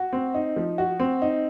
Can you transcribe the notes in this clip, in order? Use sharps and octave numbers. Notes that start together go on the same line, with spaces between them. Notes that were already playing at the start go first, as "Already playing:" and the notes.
Already playing: F#4
C4
D#4
F3
F#4
C4
D#4